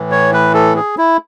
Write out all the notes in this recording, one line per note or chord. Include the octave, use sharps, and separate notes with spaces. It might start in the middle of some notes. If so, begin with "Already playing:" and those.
Already playing: A2 E3
C#5
B4
A4
G#4
E4